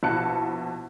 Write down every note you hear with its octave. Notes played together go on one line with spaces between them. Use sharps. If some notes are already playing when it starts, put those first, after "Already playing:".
A#1 B2 E4 A5 F#6 C#7